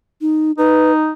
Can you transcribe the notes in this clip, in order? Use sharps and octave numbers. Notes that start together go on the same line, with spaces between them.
D#4
D#4 B4